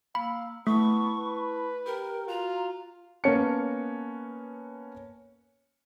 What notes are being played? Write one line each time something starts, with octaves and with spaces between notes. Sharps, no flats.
A#3 F5 B5 E6
A3 B3 E4 A5 B5 C#6
B4
G4 A#4 G5 A#5
F4 F#4 A#5
A#3 B3 C#4 A5 C#7